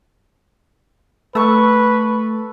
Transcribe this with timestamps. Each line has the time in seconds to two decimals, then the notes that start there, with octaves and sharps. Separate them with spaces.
1.35 A3 A4 B4 C#6